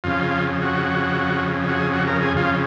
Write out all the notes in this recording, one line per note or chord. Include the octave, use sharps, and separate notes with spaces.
F2 C#3 F4
F#4
F#4
G#4
F#4
A#4
G#4
F2 C#3 F4